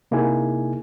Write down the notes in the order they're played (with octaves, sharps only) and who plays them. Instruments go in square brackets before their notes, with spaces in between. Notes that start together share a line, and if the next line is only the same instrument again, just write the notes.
[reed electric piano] C3 A#3 D#4 E4 G#4 G#5